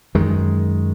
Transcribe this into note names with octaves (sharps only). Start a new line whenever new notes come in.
F#2 D#3 G#3